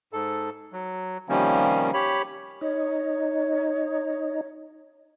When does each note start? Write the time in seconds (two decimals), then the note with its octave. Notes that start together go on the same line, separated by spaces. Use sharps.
0.13 G#2 A4
0.73 F#3
1.29 C3 D#3 F3 G3 A#3 C#4
1.94 G4 C#5 B5
2.61 D#4 C#5